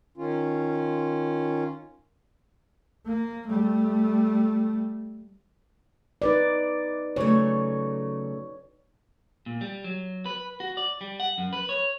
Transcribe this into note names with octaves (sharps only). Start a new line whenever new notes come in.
D#3 C#4 F4
A#3
G3 A3
D#4 B4 D5
C#3 F#3 A3 C#5
A#2
G3
F#3
B4
F#4
D5
G3
F#5
F#2
B4
C#5